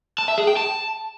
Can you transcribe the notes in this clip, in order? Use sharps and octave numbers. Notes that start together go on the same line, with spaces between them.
A5
E5
G#4
G5
A5